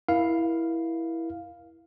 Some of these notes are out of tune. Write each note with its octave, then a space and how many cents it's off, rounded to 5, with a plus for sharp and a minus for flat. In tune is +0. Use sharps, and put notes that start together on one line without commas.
E4 +0 A#4 +30 F5 +0